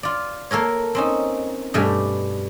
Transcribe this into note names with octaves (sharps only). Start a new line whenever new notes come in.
F4 D5
A#3 A4 A#4 C#5
C4 C#4 D#4
G2 B2 G3 A3 G4 G#5